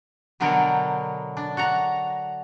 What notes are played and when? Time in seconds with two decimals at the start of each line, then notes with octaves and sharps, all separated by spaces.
0.40 B2 D3 F#3 B3 A#4 G5
1.37 D4
1.57 F#4 F#5 A#5